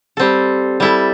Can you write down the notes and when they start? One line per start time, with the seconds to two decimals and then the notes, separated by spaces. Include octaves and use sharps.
0.17 G3 C4 A4
0.80 G3 E4 A4